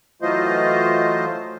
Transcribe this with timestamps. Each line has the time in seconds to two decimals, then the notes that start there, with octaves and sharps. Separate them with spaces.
0.22 E3 F#3 A3 F4 C5 D#5